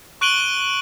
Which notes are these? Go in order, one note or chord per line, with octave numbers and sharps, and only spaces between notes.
C#6 F#6 D7 D#7 F#7 G7